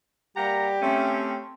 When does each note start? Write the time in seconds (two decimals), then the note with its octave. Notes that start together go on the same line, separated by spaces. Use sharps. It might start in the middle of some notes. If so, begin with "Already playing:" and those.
0.37 G3 A#3 G4 F#5 A#5
0.82 A3 C4 C#4